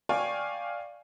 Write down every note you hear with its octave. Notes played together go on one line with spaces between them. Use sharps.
D5 F5 G5 G#5 C#6